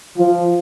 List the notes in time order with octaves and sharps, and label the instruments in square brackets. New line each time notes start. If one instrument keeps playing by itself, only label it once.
[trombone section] F3